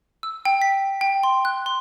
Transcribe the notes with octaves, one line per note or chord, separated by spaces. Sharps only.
E6
G5
B6
G5
C6
F#6
C6